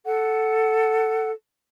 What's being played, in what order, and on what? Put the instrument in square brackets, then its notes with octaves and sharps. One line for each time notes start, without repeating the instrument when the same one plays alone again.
[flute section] A4 F#5